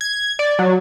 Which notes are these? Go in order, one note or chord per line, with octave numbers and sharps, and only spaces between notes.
G#6
D5
F#3